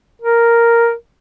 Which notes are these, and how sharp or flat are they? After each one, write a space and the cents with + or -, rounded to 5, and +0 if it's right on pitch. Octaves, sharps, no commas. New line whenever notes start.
A#4 +0